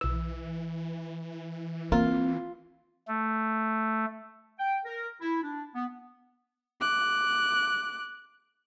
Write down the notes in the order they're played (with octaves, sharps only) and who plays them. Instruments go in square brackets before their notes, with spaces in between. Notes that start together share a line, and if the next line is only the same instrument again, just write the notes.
[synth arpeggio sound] B1 E6 [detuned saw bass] E3
[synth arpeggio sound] A#3 A#4 [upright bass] C4 [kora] F4
[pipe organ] A3
[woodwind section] G5
A#4
E4
D4
B3
[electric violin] D6 F#6